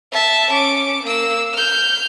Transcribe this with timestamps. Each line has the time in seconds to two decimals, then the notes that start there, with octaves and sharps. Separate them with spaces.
0.13 E5 A5
0.52 C#4 D6
1.03 A#3 E6
1.54 F6 G6